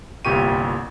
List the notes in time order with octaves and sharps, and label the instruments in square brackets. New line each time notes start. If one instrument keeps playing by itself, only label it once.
[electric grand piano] G1 C2 A#2 G4 C#6 D#7